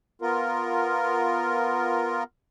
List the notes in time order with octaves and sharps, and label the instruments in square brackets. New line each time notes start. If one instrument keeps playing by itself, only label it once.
[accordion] B3 F4 A#4